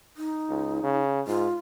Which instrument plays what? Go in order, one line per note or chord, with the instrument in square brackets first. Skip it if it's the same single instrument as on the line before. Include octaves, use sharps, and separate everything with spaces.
[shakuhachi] D#4
[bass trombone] C#2
C#3
[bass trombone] G#2 [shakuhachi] F4